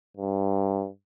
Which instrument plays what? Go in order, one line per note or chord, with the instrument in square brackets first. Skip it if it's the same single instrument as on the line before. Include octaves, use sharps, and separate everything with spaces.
[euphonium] G2